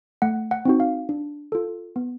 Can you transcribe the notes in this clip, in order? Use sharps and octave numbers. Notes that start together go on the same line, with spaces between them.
A3 F#5
F#5
C4 D#4 F#4
F5
D4
F4 A4
B3